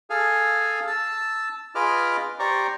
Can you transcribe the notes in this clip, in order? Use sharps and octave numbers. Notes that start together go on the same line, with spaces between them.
G#4 A4 F5 G#5
A5 E6
F4 G#4 B4 D#5 D6 F6
G4 C5 D5 A#5 C#6